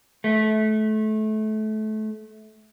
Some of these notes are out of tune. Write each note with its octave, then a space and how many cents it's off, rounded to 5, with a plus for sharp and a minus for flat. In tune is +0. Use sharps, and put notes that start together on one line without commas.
A3 -25